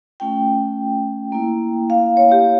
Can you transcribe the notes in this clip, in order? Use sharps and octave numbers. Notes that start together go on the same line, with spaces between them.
A3 C#4 F4 G5
A#3 E4
F5
C#5
G4